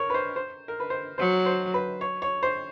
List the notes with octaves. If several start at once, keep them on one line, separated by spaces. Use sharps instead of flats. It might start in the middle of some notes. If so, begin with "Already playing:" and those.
Already playing: A#4 C#5
B4
C5
C5
A#4
B4
C5
F#3 C5
C5
B4
C#5
C#5
C5